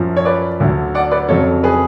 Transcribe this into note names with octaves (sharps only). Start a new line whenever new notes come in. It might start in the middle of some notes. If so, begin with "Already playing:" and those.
Already playing: F#2 F3
C#5
B4 D5
D2 D3 F#3
D5 F#5
B4 D5
F2 C#3 F#3 A4 C#5
G#4 B4